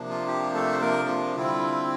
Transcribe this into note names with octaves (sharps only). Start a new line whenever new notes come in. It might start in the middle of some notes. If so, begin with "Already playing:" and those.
Already playing: C3 F3 A#3 D4
F4
G4
A3 A4
C5
A#3 A#4
F4
D3 G3 C4 E4 F4